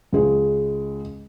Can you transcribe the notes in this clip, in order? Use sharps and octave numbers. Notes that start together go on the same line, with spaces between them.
C#2 G#3 C#4